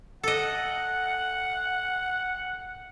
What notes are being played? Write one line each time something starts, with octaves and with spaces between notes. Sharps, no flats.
A4 D#5 F#5